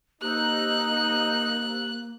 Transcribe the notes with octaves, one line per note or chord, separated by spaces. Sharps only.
A#3 D#4 G4 C5 E6 F#6